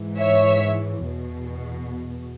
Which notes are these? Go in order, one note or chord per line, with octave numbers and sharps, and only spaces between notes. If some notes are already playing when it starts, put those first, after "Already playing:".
Already playing: G#2 E3
C#5 E5
E2 B2